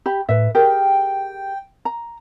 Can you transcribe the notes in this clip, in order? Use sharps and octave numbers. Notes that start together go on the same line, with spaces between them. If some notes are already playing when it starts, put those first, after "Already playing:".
G4 B5
A2 B4 E5
G4 G#4 A#4 G5
A#5